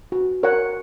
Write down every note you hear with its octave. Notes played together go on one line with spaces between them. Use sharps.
F#4
A#4 C#5 F#5